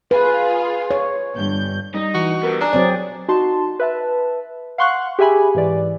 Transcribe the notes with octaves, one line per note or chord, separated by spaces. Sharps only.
F4 G#4 B4
C#5
G1 G2 G6
G3 D#4
E3 F#4
G3 B3 A#4
D4 G#4 A#5
F#3 C4 D5
D#4 F#4 A5 C6
B4 E5 A5
F5 F#5 C6 C#6 F#6
G4 G#4 E5 G#5 B5
G#2 E3 D5